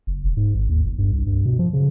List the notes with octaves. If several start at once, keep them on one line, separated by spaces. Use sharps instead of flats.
F#1
E1
G#2
G#1
D#2
G1
G2
C2
G2
B2
F3
C#3